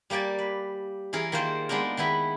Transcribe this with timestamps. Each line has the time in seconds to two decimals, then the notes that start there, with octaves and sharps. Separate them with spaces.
0.10 G3 A#3 G4 D5 G#5
0.38 B4
1.13 E3 E4 G#4 A#4
1.32 D#3 A#3 F4 C5
1.69 G#3 B3 D4 D#4 A#4
1.97 D#3 B3 E4 B4